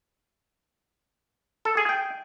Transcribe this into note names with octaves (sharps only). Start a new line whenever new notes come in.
A4
G#4
G5